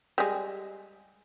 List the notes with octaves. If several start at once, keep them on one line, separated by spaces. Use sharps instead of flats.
G3 G#3